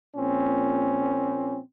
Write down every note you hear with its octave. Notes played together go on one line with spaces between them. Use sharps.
A#1 A#2 C4 C#4